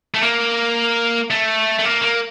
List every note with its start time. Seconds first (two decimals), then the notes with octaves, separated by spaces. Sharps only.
0.14 A3
0.23 A#3
1.30 A3
1.79 A3
1.85 A#3
2.02 A#3